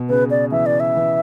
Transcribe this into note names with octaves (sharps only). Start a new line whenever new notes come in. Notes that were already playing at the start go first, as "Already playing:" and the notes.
Already playing: B2
C#3 B4
D5
E3 E5
D5
E5
E3